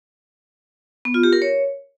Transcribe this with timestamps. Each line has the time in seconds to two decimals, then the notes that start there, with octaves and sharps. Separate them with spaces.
1.05 B3
1.14 F4
1.23 G4
1.33 A#4
1.42 C#5